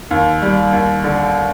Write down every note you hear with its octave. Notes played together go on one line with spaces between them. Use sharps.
D#2
G3
D#2
D3